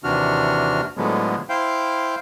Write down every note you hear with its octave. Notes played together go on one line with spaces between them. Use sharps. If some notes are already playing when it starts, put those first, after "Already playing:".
D#2 C3 E3 D4 F#4 F6
A2 D3 F3 F#3 G#3 B3
E4 C5 F5 G5